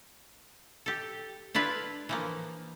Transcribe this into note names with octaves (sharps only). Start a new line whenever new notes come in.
G4 A4
D4 E4 F4 B4
E3 F3 A#3